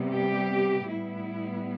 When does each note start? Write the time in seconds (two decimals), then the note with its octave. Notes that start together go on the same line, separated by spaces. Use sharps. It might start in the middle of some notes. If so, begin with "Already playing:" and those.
Already playing: C3 G3 B3
0.11 G4
0.90 A2 G3 B3 E4